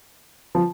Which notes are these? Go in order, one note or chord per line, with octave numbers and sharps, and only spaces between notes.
F3